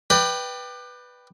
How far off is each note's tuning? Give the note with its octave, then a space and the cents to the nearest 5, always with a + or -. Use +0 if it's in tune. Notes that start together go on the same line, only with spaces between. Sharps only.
B4 +0 D5 +30 G5 +0